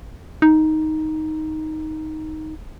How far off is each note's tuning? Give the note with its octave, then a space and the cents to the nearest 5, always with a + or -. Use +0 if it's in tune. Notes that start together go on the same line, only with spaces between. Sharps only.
D#4 +5